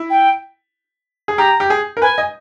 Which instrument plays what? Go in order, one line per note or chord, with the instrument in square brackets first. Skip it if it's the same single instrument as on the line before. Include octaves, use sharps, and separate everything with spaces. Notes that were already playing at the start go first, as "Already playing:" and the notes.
Already playing: [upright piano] E4
[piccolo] G5
[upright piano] G#4
[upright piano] G4 [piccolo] A#5
[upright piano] G4
G#4
A#4
[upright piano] B4 [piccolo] G#5
[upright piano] D#5